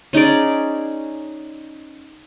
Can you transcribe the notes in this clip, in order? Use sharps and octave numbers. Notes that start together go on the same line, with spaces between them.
C#4 D#4 G#4 D5